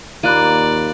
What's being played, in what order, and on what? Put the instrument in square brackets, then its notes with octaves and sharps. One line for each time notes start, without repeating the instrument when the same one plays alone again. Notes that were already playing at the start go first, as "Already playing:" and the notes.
[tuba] D#2 [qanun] A#3 F4 [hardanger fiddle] D5 [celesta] B5 F#6 D#7